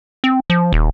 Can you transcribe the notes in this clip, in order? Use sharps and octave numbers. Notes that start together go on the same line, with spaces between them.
C4
F3
D#1